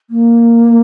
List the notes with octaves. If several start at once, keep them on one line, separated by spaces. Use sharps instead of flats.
A#3